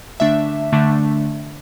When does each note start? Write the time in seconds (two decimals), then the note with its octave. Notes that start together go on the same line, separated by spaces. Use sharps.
0.20 D3 A3 D4 E5
0.73 D3 A3 D4